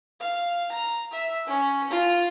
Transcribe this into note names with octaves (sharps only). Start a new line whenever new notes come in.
F5
A#5
E5
C#4
F4